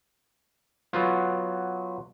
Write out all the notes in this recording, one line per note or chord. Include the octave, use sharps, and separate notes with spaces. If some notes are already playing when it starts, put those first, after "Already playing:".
F#3 B3 F4